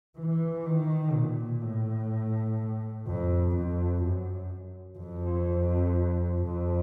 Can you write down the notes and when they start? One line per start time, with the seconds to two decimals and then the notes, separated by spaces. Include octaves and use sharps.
0.18 E3
0.66 D#3
1.15 A#2
1.62 A2
3.07 F2
3.55 F2
4.03 F#2
4.99 F2
6.43 F2